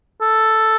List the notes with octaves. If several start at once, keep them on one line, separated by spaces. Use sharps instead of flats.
A4